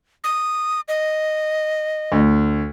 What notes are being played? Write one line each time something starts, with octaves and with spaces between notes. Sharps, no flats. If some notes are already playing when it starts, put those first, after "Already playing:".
D#6
D#5
D2